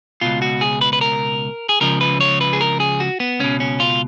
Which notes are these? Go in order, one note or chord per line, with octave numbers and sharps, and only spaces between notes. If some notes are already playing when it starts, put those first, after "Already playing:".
C#2 B2 F4
F#4
G#4
B4
B4
A#4
G#4
C#2 C#3 F3 A#4
B4
C#5
B4
G#4
A#4
G#4
F#4
B3
C#2 B2 C#4
C#4
F4